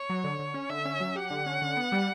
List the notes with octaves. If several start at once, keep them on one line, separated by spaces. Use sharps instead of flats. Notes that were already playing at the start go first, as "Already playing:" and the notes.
Already playing: C#5
F#3
D3
D3
C#4
D3 E5
C#4
F#3
G4 F#5
D3
C#4
D3
B3
G3